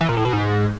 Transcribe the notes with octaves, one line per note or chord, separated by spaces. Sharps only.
E3
A#2
A2
B2
G#2